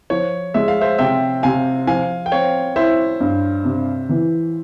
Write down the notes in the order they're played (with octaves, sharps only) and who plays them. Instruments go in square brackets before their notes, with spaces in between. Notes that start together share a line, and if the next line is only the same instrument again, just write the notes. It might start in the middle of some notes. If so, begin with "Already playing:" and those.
[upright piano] F3 [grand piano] C#5
[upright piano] G#3 [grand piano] E5
[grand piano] F5
C5 E5
[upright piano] C3 [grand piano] E5 G5
[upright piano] C3 [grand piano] F5 G#5
[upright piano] F3 [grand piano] F5 G#5
[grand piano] G5
[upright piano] C4 [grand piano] C#5 F5
[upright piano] E4 [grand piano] C5 E5
[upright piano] G2
C3
E3